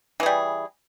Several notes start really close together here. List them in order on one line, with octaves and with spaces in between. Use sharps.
E3 G#4 G3